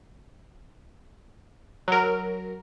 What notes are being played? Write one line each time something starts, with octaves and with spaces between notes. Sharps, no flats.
F#3 A#4